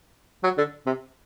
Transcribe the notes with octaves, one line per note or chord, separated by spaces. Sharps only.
F#3
D3
C3